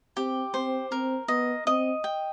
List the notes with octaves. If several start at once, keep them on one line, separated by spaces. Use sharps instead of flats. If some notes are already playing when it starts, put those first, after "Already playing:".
C4 G4
C4 C5
C4 A#4
B3 D#5
C4 D#5
G5